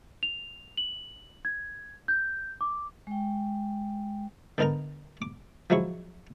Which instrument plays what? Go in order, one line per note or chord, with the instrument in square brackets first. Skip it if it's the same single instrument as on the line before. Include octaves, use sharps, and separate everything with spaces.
[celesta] F7
F#7
G#6
G6
D6
[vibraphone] G#3 G5
[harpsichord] D3 B3 D#4 A#4 A#5
D6
F3 F#3 G#3 E4 C#6